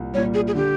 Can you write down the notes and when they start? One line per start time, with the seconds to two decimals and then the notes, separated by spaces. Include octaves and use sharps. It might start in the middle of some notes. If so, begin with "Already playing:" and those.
Already playing: C2 A#2
0.14 G3 C#5
0.17 A#2
0.34 G#4
0.47 G#4
0.55 D3 G4